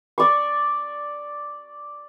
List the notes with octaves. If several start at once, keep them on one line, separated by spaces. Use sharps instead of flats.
D5 C#6